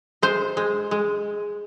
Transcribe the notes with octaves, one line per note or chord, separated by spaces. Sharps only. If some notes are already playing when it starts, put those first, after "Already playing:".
G#3 C5
G#3
G#3